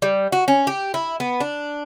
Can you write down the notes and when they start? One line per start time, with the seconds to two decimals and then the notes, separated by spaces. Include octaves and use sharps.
0.02 G3
0.32 F#4
0.48 C#4
0.67 G4
0.94 E4
1.20 B3
1.40 D4